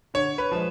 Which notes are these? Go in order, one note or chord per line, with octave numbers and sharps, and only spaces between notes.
D3 C#5
B4
F3 G#3